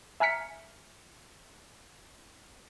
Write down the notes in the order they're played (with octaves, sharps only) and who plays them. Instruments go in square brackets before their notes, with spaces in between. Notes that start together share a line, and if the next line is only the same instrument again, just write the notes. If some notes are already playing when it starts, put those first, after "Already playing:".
[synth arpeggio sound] E5 G#5 A#5 F6 B6 C#7